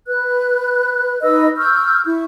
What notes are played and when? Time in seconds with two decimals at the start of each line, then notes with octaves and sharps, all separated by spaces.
0.07 B4 F#6
1.22 D#4 B4 D#5 E6
1.58 C#6 E6 F6 G6
2.06 E4 C#6